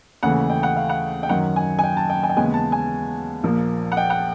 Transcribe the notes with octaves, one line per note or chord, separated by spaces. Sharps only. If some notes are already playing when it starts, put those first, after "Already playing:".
D#2 C#3 E3 A3 F#5
G5
F#5
F5
F#5
G5
F#2 D#3 F#3 F#5
G#5
G#5
G5
A5
G5
G#5
G5
D#2 C#3 E3 G#3 B3 G#5
A5
G#5
A#1 A#2 F3 A#3
F#5
G5
F#5